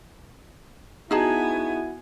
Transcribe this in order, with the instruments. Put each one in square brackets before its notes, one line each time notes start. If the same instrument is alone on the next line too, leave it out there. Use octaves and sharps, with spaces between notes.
[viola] B3 G#5 [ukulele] D#4 G#4 A5 [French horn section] E4 F#4